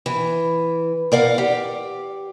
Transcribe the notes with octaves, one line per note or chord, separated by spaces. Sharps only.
E3
A#4 D5 F5 F#5
G4